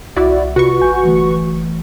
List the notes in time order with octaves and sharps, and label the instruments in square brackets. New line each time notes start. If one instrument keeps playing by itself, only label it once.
[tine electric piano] C2 E5 [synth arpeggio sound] E4 F#4 D5
[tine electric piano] C3 F4 [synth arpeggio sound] F#4 B4 C#6
[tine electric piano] A1 G#5 G6
G1 E3 A3